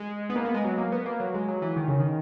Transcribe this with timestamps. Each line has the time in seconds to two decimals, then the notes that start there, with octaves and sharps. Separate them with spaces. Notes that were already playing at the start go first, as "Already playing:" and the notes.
Already playing: G#3
0.30 B3
0.36 A#3
0.45 B3
0.54 G#3
0.64 F#3
0.78 A#3
0.92 B3
1.06 A#3
1.20 F#3
1.34 G#3
1.48 F#3
1.62 E3
1.76 D#3
1.88 C#3
2.00 D#3